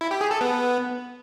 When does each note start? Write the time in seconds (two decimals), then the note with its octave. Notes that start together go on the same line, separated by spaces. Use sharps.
0.01 E4
0.11 G4
0.21 G#4
0.31 A4
0.41 B3